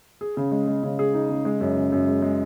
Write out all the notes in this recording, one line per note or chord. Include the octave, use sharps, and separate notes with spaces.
G#4
C#3
G#3
G#3
C#3
G#4
D#4
C#3
G#3
F#2
C#3
F#2
G#3
G#3